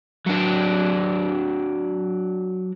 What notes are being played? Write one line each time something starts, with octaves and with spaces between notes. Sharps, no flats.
F#3 D4